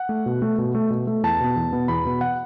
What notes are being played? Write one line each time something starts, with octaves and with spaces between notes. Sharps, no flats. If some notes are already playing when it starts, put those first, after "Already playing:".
Already playing: F#5
A3
B2
A3
B2
A3
B2
A3
E2 A5
B2 B3
E2
B2 B3
E2 B5
B2 B3
F#5